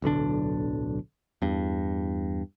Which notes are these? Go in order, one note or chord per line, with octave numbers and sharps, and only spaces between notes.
D1 B1 D3 D4
E2 G2